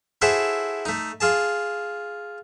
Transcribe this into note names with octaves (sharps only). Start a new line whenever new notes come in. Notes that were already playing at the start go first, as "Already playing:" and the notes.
E4 F#4 G#4 A4 C5 E5
A3 D#4
F4 G#4 A5